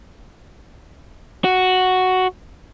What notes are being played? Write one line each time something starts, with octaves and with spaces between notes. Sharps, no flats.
F#4